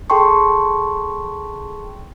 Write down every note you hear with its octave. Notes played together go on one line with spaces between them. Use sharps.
G#4 A4 G5 A5 C6 C#6